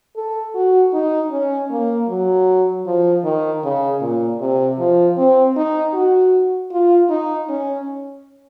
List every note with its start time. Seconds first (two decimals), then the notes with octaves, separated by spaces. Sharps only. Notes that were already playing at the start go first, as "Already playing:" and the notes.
0.16 A4
0.55 F#4
0.93 D#4
1.31 C#4
1.71 A#3
2.09 F#3
2.86 F3
3.24 D#3
3.64 C#3
4.01 A#2
4.40 C3
4.79 F3
5.17 C4
5.57 D#4
5.94 F#4
6.72 F4
7.10 D#4
7.49 C#4